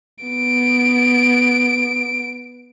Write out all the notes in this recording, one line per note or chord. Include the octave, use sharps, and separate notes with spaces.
B3 D7